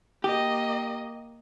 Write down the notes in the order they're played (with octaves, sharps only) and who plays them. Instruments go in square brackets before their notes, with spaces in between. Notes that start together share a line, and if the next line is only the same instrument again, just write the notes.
[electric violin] A#3 D#5 [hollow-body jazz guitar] G4